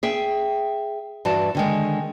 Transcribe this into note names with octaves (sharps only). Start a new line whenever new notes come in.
G#4 E5 G5
G2 E3 F#4 A5
D3 D#3 G#3